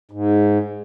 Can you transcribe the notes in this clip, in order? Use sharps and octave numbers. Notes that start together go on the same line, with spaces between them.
G#2